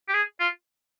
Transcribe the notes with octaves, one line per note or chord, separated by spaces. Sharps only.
G4
G#4
F4